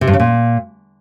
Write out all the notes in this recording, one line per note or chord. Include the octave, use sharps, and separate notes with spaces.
C3
G2
C#3
A#2